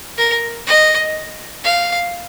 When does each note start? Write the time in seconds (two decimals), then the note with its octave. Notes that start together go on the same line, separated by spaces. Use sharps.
0.18 A#4
0.67 D#5
1.65 F5